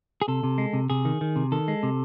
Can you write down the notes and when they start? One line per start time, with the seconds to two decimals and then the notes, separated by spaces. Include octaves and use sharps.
0.22 G#4
0.28 C3 A4
0.43 C3
0.58 G#3
0.73 C3
0.90 C3 G#4
1.05 D#3
1.21 D#3
1.36 C3
1.52 D#3 A4
1.68 G#3
1.83 C3